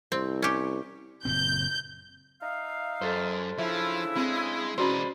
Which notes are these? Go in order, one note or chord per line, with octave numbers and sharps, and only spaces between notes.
C2 C4
C#4 G4
F#1 A#2 C4 G6
D#4 E5 F5
F#2 A4 C5
C#3 F3 D4 E4 E5
G#3 C4
E3 G#3 C#4 F#4 C5 D5 B5 C6